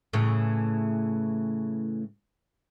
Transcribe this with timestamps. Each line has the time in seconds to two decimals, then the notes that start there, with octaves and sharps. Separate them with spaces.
0.13 A2 C#3 E3